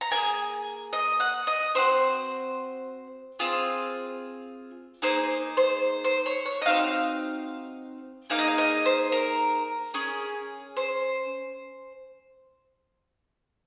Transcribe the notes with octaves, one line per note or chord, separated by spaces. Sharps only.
A#5
A#3 F4 G#4 G#5
D#5
F#5
D#5
C4 D#4 F#4 C5
C4 F4 G#4
A#3 D#4 G#4 C5
C5
C5
C#5
C#5
D#5
C4 D#4 F#4 F5
A#3 D#4 G#4 F5
D#5
F5
D#5
C5
A#4
C#4 G#4
C5